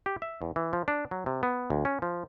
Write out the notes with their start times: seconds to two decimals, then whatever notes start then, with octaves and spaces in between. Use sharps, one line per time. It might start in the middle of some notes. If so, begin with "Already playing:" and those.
0.06 G4
0.22 E5
0.42 E2
0.56 E3
0.73 F3
0.88 D4
1.11 F#3
1.26 C3
1.43 B3
1.70 D2
1.85 C#4
2.02 F3